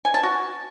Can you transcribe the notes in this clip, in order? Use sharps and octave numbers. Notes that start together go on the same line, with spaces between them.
G#5
A5
F#4